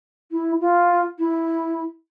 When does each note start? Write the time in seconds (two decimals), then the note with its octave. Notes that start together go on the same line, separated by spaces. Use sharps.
0.31 E4
0.60 F4
1.18 E4